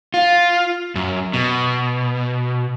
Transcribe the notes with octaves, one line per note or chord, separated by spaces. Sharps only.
F4
F#2
B2